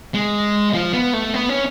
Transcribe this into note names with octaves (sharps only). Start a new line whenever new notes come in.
G#3
F3
B3
A3
B3
C#4